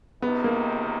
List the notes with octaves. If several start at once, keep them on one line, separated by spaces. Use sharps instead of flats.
C#2 C3 D#3 B3
A#3